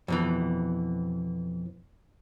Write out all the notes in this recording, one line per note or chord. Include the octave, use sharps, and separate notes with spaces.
F2 B2 E3